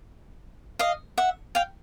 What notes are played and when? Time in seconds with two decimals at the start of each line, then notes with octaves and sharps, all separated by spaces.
0.79 D#5 F5
1.18 E5 F#5
1.55 F5 G5